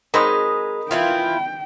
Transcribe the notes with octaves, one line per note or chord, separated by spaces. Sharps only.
F#3 G#3 C4 D#4 A#4 B5 D#6
E3 E4 F4 G5